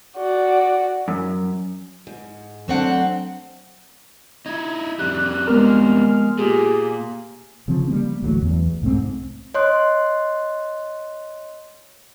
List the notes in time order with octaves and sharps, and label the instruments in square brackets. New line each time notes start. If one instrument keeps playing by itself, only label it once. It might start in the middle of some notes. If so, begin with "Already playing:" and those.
[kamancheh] F#4 D5
[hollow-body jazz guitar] F#2
[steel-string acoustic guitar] G#2
F#3 A3 C4 D4 F#5
[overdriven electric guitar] D#4 E4 [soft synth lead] G#6
[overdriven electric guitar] F2 G3 [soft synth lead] F#6
[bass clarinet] G#3 [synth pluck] B3 A#4 [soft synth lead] F6
[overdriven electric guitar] A#2 [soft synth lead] G4 [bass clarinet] G#4
[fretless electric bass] C#3 F3 C4
G3 A#3 C#4
A1 D2 F#3 A3
E2
C2 G#2 A3 C4
[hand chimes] C#5 D#5 C6 F#6